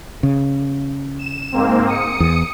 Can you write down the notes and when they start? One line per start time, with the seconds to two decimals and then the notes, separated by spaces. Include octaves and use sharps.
0.23 C#3
1.19 E7
1.52 G#2 A#3 C4
1.86 D#6 C#7
2.20 E2